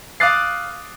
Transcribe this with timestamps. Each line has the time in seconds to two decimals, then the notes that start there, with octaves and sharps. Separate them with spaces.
0.20 F5 D6 D#6 F#6 A6 C7